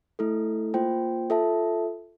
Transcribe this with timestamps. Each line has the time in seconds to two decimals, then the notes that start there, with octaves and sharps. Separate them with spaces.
0.19 A3 E4 A4
0.74 A#3 F4 C5 G5
1.30 F4 A4 E5 A5